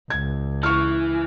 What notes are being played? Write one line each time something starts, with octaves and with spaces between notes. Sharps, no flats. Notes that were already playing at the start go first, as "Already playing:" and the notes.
C#2 G#6
E3 C#6 F6